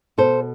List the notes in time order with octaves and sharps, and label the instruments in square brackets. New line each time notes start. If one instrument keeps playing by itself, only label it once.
[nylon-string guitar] B2 A4 C5